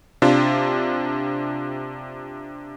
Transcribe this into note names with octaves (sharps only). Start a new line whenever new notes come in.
C3 D4 F4